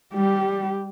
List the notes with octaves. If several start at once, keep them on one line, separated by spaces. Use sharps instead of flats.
G3 G4